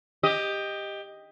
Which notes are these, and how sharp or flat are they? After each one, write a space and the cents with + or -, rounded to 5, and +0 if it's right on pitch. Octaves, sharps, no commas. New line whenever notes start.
G4 +15 D#5 +0